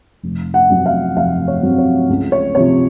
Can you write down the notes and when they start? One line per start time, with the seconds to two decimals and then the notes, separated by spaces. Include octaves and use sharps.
0.23 F1
0.54 F#5
0.70 F2 C3 F#3 C4
0.86 F5
1.17 F1 F5
1.48 C#5
1.62 F2 C3 F#3 C4
1.78 C#5
2.09 C#2
2.32 C#5
2.55 C3 F3 C#5